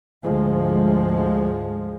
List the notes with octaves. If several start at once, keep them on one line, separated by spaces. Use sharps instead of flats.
D2 G#2 F3 G#3